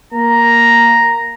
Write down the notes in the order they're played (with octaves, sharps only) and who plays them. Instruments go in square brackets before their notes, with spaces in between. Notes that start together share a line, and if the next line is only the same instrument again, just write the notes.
[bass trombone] A#3 [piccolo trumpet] A#5